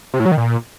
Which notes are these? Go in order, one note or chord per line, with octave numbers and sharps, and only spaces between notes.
C3
A2
F#3
D#3
A#2